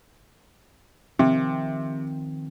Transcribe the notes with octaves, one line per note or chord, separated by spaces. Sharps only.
C3 D#3 F3 C4